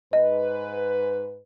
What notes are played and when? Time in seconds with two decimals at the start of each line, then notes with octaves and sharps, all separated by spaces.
0.13 G#2 B4 D#5